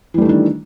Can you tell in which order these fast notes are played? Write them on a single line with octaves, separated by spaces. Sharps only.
E3 G3 A3 D#3 D4